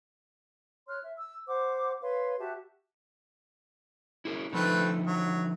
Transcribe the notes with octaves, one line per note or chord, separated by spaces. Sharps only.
C#5 C6 F6 F#6
E5
E6
C5 F#5 D6
B4 C#5 F5 C6
F#4 G4 E5 A5
E4 G#4 A#4
D3 F3 A3 C4 D#4 B4
F#3